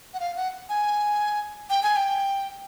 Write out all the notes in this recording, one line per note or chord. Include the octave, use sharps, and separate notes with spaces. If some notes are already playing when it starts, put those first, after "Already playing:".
F#5
F5
F#5
G#5
G5
G#5
G5